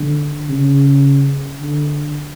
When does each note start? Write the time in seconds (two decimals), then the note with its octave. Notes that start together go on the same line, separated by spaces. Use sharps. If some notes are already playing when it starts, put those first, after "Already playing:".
Already playing: D3
0.49 C#3
1.61 D3